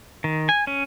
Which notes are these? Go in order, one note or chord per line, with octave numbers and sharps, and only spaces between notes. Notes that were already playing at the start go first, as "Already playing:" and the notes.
D#3
G#5
C#4